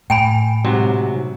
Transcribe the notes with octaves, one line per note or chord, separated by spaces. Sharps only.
A2 G5 G#5 B5
G#2 C3 F#3